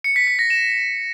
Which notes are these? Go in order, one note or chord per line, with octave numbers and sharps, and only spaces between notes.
C#7
B6
B6
A#6
E7